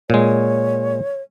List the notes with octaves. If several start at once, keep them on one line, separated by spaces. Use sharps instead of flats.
A#2 G#3 C#5